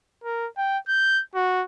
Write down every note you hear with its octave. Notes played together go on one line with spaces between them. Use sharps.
A#4
G5
G6
F#4